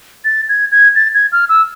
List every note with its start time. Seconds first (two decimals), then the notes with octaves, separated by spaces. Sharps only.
0.25 A6
0.49 G#6
0.72 G#6
0.96 A6
1.14 G#6
1.32 F6
1.49 E6